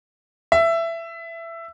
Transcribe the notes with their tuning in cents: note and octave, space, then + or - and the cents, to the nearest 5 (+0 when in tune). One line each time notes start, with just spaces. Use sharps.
E5 +15